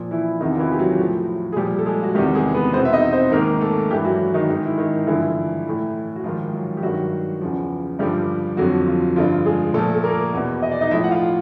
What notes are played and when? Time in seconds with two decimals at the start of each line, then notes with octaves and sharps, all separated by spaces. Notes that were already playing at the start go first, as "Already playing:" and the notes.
Already playing: A#2 F3
0.11 E3 E4
0.40 E2 C3 D#3 D#4
0.55 F4
0.59 E3 E4
0.72 G4
0.79 F#3 F#4
0.99 A2 F3
1.52 G#4
1.56 A#2 F3 G3 G4
1.79 A4
1.86 G#3 G#4
2.03 F#4
2.15 E2 C3 D#3 G3 G4
2.34 G#3 G#4
2.54 B3 B4
2.73 E2 C4 C5
2.78 B2
2.85 E5
2.93 D#4 D#5
3.12 C4 C5
3.32 G#2 D#3 A#3 A#4
3.61 A3 A4
3.90 G2 E3 G3 G4
4.05 F#3 F#4
4.34 D#3 D#4
4.50 G#2 D#3
4.66 E4
4.78 D#3 D#4
5.07 G2 D3 E3 F3 E4
5.66 A2 E3
6.16 F#4
6.24 G#2 D#3 F3 F4
6.53 F#3 F#4
6.77 G4
6.82 G2 D#3 F#3 F#4
7.41 E2 C#3 F3
7.99 G2 D3 F3 G3 G4
8.57 F2 D3 F3 F#3 F#4
8.86 F3 F4
9.16 G2 D3 F3 F4
9.46 G#3 G#4
9.74 A#2 A3 A4
9.79 F3
9.94 A4
10.04 A#3 A#4
10.33 E2 B2
10.62 D#5
10.71 D5
10.81 D#4 D#5
10.91 F3 E4 E5
10.94 A2
11.04 F#5
11.11 F4 F5